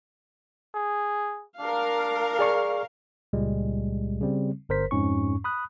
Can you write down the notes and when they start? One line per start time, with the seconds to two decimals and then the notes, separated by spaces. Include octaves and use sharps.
0.75 G#4
1.60 D4 A#4 F5
2.39 G#4 D5 C#6
3.33 C#2 A#2 G3 G#3
4.21 C#3 G3 C4
4.69 G1 A#4 C5 B6
4.91 F2 G#2 C#4 C#6
5.44 B5 D#6 F#6